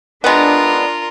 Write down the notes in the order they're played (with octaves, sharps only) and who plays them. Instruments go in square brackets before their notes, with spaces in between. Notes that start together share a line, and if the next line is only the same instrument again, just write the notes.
[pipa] G#3 B3 [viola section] D4 [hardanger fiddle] F4 A#4